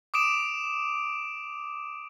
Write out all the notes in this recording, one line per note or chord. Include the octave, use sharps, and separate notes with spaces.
D6 D#6 D7 E7